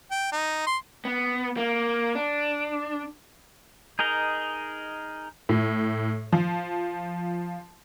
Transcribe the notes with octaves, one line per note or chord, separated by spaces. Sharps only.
G5
D#4
C6
B3
A#3
D4
D#4 G#4 A#4 D#5
A2
F3